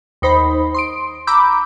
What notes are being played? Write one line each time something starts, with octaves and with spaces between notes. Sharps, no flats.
D#2 D#4 C5 B5
C6 D#6 D7
A#5 B5 D6 E6 G6